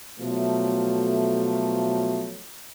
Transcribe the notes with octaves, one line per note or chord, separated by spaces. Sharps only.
B2 F3 F#3 A3